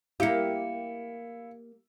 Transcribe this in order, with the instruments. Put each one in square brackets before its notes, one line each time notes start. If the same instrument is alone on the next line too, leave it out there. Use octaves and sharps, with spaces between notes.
[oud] A#3 G4 [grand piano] E4 [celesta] F5 C#7